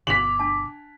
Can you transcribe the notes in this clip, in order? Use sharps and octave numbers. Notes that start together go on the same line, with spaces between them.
G1 B2 B3 D6 B6 F7 F#7
D4 A5